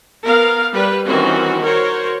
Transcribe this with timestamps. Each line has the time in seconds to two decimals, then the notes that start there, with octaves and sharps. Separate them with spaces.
0.24 B3 A#4 F5
0.73 G3 B4
1.06 D#3 E3 C4 C#4 F#4
1.61 F#4 A#4 C5 C#5